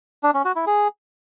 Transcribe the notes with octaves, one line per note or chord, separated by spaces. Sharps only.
D4
C#4
F#4
E4
G#4